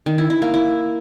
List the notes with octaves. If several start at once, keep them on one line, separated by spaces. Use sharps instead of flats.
D#3
E4
E4
A#3
E4